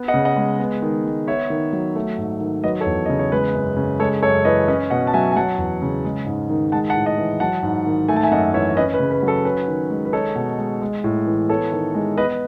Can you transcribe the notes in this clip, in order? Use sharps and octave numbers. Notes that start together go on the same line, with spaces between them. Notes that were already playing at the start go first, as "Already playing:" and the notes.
Already playing: B3
D#5 F#5
C#3
D#5 F#5
G#3
B3
D#3
G#3
B3 C#5 E5
D#3
F#3
A3
G#2
D#3
F#3 B4 D#5
A4 C#5
E2
C#3 D#5
C#5
G#3 B4
F#2
C#3
G#3 A4 C#5
F#2 A4 C#5
E3 B4 D#5
C#4 B4 D#5
B2 D#5 F#5
A5
F#3 E5 G#5
G#5
F#3 F#5 A5
E2
C#3
G#3
G#2
D#3
G#3 F#5 A5
F#5 A5
A2
D#5 F#5
E3
F#3 F#5 A5
G#2
D#3
A3 G#5
A5
E5 G#5
F#2 D#5 F#5
E3 C#5 E5
C#4 B4 D#5
B4
C#3
B4
F#3
A4
C#4 B4
D#3
G#3
B4
D#4 A4 C#5
B2
G#3
G#3
A2
E3
B3 A4 C#5
D#3
G#3
B3 B4 D#5